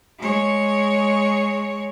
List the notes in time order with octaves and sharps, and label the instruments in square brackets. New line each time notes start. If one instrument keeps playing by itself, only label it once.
[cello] G#3 C#5